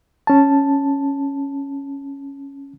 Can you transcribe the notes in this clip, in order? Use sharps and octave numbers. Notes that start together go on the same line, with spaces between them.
C#4 A5